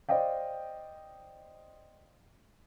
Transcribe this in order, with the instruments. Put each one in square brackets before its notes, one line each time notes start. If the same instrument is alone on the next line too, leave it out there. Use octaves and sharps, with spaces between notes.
[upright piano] C5 D5 D#5 F5 G5